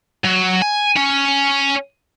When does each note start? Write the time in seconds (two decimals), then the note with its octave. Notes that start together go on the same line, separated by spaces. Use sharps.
0.24 F#3
0.62 G#5
0.97 C#4